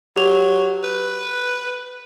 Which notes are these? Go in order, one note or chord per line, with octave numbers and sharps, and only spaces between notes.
F#3 G4 F7
B4